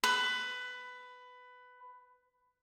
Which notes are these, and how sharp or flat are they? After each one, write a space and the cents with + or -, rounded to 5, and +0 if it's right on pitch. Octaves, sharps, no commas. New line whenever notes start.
B4 +15